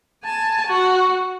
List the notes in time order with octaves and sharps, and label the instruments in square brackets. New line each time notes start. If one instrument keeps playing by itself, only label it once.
[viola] G#5 A5
F#4